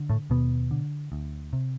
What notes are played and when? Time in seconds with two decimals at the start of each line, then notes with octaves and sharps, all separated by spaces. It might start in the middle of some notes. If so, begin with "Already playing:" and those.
Already playing: D3
0.10 A2 A3
0.30 D#2 B2 B3
0.71 D3
1.12 D2
1.53 C3